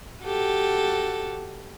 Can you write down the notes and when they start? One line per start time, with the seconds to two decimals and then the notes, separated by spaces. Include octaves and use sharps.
0.23 F#4 G4 A4